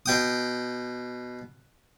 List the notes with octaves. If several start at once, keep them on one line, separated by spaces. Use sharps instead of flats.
B2 G5 D#6